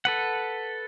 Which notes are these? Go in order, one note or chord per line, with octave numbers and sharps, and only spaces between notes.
A4 B4 F#5